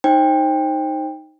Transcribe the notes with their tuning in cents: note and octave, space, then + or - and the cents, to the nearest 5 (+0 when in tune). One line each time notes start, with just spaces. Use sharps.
D#4 +0 C5 +25 G5 +20